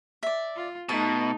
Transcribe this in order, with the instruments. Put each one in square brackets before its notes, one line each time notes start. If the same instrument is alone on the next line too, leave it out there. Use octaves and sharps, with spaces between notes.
[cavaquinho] D5 E5
[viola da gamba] F4
[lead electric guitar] B2 [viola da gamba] A3 D#4 [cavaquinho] A5